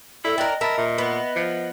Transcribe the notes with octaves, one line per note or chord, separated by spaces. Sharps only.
E4 A4 D5 E5
D4 A#4 D#5 G5 F#6
A#4 E5 A5 B5 A6
A#2 E5
B3
F3